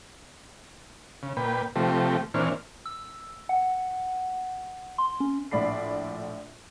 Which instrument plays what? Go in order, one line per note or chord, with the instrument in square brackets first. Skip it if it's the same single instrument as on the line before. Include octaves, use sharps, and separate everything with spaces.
[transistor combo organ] C#3
A#2 B4 G5
C3 F3 A3 G4
A#2 E3 C4 D4 C#5 F6
[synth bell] E6
F#5
C6
C#4
[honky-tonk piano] A#1 A2 D5 B5 C7